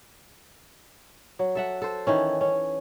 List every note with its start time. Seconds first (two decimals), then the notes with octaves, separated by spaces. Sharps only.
1.39 F#3
1.55 A4 E5 F#5
1.82 A4 C5
2.07 D#3 E3 C#4
2.41 C#4